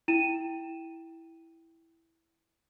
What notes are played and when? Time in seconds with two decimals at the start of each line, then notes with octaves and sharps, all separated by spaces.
0.08 E4 G5 D#7 E7